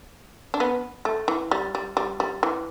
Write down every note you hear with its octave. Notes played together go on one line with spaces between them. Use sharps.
D4
B3
A3
E3
G3
G3
G3
G3
E3